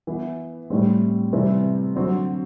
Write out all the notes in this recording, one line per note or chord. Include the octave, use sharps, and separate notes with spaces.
E3 B3 E4
A2 G3 C4
C3 E3 G3 C4 E4
D3 F#3 C4 F#4